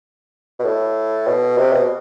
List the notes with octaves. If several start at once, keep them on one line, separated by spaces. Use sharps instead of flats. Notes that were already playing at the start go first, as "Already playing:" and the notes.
B2
A2
B2
C3
B2